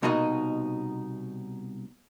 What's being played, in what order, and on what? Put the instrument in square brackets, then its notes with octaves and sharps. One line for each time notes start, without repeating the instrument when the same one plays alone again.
[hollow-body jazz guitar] C2 B2 A#3 D#4 F#4 D#5